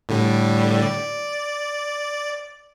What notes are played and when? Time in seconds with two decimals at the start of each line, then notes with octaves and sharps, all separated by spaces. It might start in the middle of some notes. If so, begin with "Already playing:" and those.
0.09 A2 D3 G3
0.82 D5